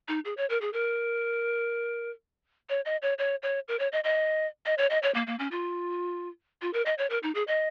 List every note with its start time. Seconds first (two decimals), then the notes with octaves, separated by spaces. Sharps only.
0.08 D#4
0.25 G#4
0.37 C#5
0.49 A#4
0.61 G#4
0.73 A#4
2.69 C#5
2.85 D#5
3.02 C#5
3.18 C#5
3.42 C#5
3.68 A#4
3.79 C#5
3.92 D#5
4.04 D#5
4.66 D#5
4.78 C#5
4.90 D#5
5.03 C#5
5.15 A#3
5.27 A#3
5.39 C#4
5.51 F4
6.62 F4
6.74 A#4
6.86 D#5
6.98 C#5
7.10 A#4
7.23 D#4
7.35 G#4
7.47 D#5